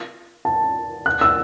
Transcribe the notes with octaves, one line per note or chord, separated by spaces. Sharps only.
A5
F#6
E6